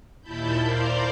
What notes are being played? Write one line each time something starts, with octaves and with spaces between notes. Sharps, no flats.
D#2 A#2 E4 A5 B5 G6
A#4 C5 D5 F5 G6